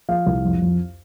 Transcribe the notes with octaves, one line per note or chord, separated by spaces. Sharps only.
F3 F5
C2
F2
F2